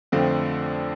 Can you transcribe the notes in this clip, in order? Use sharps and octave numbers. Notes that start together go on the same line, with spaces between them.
F2 D3 F3 A3 C4